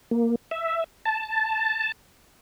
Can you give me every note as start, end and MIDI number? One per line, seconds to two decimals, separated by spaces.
0.11 0.35 58
0.51 0.84 76
1.05 1.92 81